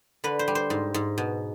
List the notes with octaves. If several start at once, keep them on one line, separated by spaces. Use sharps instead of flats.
D3 B4
C5
G3
C5
G#2
G#2
B2